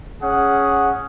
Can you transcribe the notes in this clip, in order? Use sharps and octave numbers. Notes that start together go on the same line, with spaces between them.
C#4 G#4 F#5